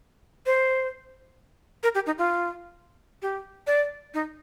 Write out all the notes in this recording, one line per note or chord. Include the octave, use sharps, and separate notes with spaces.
C5
A#4
G4
D#4
F4
G4
D5
D#4